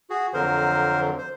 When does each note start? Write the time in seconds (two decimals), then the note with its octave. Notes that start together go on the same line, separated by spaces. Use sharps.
0.10 F#4 G#4
0.34 F2 D3 F#3 A#4 C5
1.18 C5